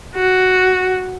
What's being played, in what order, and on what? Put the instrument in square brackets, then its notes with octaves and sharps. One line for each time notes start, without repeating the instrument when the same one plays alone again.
[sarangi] F#4